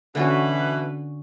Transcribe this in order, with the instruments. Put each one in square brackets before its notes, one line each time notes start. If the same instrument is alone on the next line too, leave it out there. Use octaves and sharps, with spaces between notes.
[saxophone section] B2 E3 B4 [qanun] D3 C#4 F#4